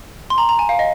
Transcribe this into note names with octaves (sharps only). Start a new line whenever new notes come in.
C6
A#5
A#5
G#5
F5
D#5